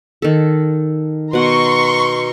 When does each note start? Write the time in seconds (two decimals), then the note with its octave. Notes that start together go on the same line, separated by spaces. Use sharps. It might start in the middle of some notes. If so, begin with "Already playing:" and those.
0.22 D#3 A4
1.33 B2 F#5 A#5 C6 C#6